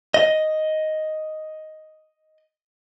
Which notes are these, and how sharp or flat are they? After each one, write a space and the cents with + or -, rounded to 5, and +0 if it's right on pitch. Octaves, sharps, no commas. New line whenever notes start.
D#5 +5